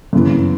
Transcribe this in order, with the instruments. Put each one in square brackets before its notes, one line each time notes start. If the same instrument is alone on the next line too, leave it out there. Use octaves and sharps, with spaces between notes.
[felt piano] F#2 C#3 E3 B3